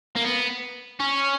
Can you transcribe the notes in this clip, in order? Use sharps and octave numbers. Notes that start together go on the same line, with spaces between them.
A#3
B3
C#4